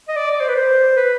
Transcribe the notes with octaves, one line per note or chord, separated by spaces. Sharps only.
D#5
D5
D5
C5
B4
C5
B4